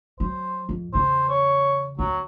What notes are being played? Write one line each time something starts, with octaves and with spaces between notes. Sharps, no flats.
F#3 C5
F2
E2 C#3 C5
C#5
D2 F#3